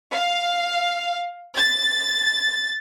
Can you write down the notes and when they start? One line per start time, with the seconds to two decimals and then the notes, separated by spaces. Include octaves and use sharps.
0.14 F5
1.56 A6